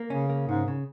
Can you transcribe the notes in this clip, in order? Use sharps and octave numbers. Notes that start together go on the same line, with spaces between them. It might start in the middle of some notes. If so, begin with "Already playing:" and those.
Already playing: A#3
C#3 C#4
A#3
G#2 C#3
C#3